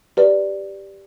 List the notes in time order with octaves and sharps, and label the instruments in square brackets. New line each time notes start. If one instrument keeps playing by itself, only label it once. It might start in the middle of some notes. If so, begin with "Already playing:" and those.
[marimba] G4 B4 D5